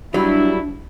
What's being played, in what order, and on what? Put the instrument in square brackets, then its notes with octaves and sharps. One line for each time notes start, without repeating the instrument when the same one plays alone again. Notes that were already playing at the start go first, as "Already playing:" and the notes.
[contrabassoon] G2 [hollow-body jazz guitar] F#3 G3 [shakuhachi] D4 [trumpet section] E4